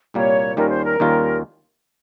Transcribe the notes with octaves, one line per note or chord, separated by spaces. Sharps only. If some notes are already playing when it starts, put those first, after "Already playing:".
C2 A#2 G3 A#3 C#5
D#2 D#3 G3 C#4 F4 A#4
C5
A#4
D#2 D#3 G3 C#4 F4